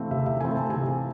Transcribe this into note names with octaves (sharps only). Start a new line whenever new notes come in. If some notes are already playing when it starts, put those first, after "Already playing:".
Already playing: C3 E3 A3 C4 F5
C3 E5
E5
E3 A3 C4 G#5
A5
C3 G#5